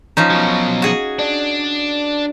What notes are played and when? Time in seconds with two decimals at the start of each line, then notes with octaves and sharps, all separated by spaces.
0.17 F3 C#4 D#4
0.30 B2 F#3
0.82 F#4 G#4
1.19 D4